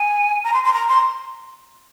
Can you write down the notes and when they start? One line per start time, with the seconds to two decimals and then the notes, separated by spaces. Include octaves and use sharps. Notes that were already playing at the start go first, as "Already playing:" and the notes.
Already playing: G#5
0.44 A#5
0.54 C6
0.64 C6
0.74 A#5
0.88 C6